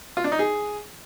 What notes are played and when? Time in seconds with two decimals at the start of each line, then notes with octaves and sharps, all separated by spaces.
0.17 F4
0.24 D4
0.32 D#4
0.39 G#4